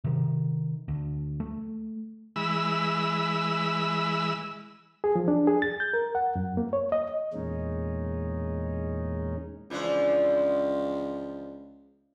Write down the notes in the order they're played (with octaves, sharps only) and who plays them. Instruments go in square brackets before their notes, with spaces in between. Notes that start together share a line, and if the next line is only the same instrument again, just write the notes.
[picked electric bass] C3 D#3
D2
A3
[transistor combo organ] E3 G#3 B5 E6
[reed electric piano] G#4
F3
D4
G#4
A6
G6
A#4
F#5
F#2
A#3
C#5
D#5
[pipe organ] E2 A#2 G#3 C#4 D#4
[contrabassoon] C#2 [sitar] E3 F3 D4